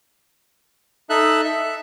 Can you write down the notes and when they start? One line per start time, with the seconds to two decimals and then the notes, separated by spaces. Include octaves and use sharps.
1.10 D#4 A4 E5 F#6
1.45 E5